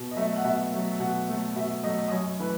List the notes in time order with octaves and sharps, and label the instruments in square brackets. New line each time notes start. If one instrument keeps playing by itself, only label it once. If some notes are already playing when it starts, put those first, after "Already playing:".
Already playing: [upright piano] B2
D#5
F#3 A3 E5
F#5
B2 E5
F#3 A3
B2 F#5
F#3 A3
B2 E5
F#3 A3 D#5
D#5
F#2 C#5
E3 A3 B4